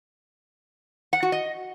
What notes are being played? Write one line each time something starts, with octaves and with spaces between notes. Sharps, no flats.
F#5
F#4
D#5